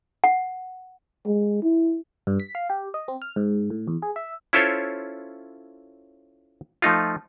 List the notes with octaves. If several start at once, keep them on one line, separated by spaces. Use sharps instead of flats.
F#5
G#3
E4
G2
B6
F5
G4
D#5
C4
F6
G#2
A2
E2
G#4
E5
C#4 E4 F4 A4 C5 C#5
F3 A3 D#4 F4